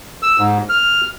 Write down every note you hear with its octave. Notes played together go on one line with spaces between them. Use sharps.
E6
G#2
F6